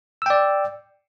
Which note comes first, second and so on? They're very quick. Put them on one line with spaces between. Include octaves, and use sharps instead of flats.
E6 G5 D5